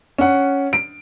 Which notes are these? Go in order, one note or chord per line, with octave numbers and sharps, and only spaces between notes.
C#4 F#5
D7